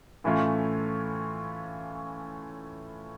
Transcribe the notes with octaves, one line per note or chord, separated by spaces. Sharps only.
A2 E3 A3 C#4 F4